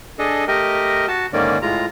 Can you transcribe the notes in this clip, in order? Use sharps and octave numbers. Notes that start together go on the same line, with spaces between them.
D4 G#4 A4 D#5
A3 G4 A#4 D#5
F#4 A5
G#2 D3 D#3 A#3 C#4 D5
A2 G#3 F4 A#5